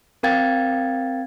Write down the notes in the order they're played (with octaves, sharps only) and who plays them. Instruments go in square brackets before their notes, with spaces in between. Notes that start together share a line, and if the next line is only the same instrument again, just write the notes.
[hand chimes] C4 A#4 F5 G5 G#6 A6